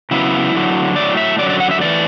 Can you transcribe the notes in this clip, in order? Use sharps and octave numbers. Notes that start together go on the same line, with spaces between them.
C#3 F#3 B3 E4
E2 D3 F#3
A2 F#3 A3 D5
E5
F#2 D3 F#3 D5
D5
F#5
E5
A2 E3 A3 D5